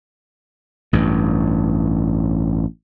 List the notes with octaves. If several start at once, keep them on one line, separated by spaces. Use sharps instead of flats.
A1 G2